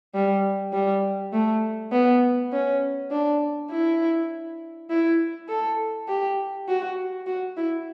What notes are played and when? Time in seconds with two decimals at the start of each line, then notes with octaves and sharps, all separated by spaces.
0.14 G3
0.73 G3
1.33 A3
1.92 B3
2.52 C#4
3.11 D4
3.71 E4
4.90 E4
5.48 A4
6.08 G4
6.68 F#4
7.26 F#4
7.57 E4